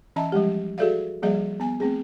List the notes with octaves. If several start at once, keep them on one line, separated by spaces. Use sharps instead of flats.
E3 C#4 D#5 E5 A5 A#5
F3 G3 G#3 G4
F#4 G#4 A4 D5 E5 F5
F3 G3 A#3 G#4 D5 E5
B3 G#5
A3 C4 G#4